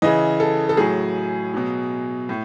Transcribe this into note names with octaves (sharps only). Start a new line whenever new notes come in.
C#3 E3 D#5
A4
A4
A2 F#3 G#4
B2 F#3
A2